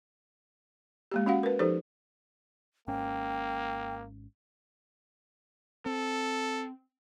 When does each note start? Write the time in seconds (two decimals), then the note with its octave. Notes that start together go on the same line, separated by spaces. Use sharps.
1.12 G#3 A#3 G4
1.26 C#4 F#4 F5 F#5
1.43 A#4 B4
1.59 F3 D#4 G4 A4 C5
2.88 G#1 G#2 A#3 C#4 G5
5.86 C4 A4